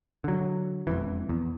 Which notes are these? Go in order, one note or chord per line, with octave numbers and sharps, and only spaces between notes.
D3 F#3
E1 F2 E3
E2